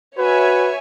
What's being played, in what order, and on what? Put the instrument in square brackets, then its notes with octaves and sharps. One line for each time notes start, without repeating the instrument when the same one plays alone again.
[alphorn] F#4 [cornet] B4 [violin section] C#5 E5 G#5